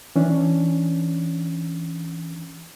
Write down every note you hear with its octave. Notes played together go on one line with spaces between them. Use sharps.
E3 C#4 D4